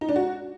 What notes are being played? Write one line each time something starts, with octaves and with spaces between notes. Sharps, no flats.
D#4
D4
F#4